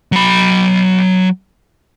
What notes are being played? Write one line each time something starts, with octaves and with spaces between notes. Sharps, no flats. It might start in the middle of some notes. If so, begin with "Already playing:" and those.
F#3 B5